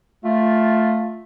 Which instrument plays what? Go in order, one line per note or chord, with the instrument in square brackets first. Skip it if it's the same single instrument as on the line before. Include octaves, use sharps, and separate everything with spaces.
[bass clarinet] A3 [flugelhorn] F4